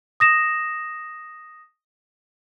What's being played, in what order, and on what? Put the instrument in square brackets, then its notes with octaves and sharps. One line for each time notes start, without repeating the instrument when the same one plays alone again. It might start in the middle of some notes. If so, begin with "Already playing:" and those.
[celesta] D#6 A#6 E7